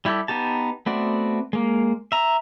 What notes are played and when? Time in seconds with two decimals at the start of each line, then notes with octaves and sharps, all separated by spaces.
0.05 G3 E4 G4 A4
0.28 B3 D#4 G4 A5
0.86 A3 B3 C4 F#4 D5
1.53 G#3 A#3
2.12 E5 A#5